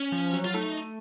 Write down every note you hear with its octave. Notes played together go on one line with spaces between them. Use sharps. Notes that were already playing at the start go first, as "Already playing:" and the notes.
Already playing: C#4
F3
F#3
F4
A3 D#4